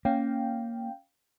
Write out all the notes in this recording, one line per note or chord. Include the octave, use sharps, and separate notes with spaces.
A#3 C#4 F5 G5